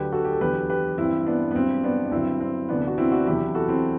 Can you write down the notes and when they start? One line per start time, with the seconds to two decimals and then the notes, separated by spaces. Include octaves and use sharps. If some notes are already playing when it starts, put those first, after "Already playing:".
Already playing: D2 D3 F#3 G4 B4
0.12 F#4 A4
0.24 G4
0.33 A4
0.40 E2 D3 F#3 G4 B4
0.70 G4 B4
0.98 G2 E3 C4 E4
1.26 B3 D4
1.51 B3
1.55 G2 F#3 C4
1.84 B3 D4
2.05 D4
2.12 G2 D3 F#3 C4 E4
2.40 C4
2.69 D2 C3 E3 B3 D4
2.87 F#4
2.98 C4 E4
3.12 D4 F#4
3.26 E2 C3 F#3 E4 G4
3.55 F#4 A4
3.68 C4 E4